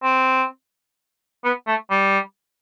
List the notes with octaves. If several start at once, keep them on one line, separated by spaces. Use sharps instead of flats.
C4
B3
A3
G3